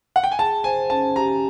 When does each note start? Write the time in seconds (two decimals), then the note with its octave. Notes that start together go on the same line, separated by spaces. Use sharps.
0.16 F#5
0.24 G5
0.31 G#5
0.39 G#4 A5
0.64 C5 G#5
0.90 C#4 A5
1.16 G4 A#5